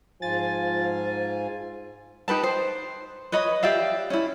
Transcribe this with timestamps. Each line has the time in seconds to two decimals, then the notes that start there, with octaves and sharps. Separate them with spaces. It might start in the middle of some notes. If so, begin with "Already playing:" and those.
0.22 G#2 F3 F4 G#5 A6
2.28 D#4 G4 B4 A5
2.43 C5
3.32 B4 C#5 D#5 B5
3.63 G4 D5 E5 F5
4.10 C#4 E4